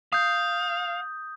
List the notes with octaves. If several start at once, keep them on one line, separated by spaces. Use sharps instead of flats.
F5 D#6 G6